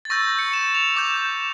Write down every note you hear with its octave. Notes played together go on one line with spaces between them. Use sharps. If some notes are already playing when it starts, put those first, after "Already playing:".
A6
C#6 E6 G6 A#6
C#7
E7
F7
D6 G6